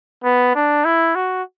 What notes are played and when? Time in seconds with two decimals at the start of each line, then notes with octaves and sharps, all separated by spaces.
0.24 B3
0.55 D4
0.85 E4
1.15 F#4